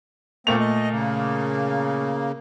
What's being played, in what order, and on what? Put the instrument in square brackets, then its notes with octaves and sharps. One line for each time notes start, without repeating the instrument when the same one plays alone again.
[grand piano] A#2 A3 F7 [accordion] A#3 C4
[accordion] D#5
C#3 A#3